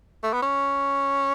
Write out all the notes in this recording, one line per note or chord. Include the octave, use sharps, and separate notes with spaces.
A3
B3
C#4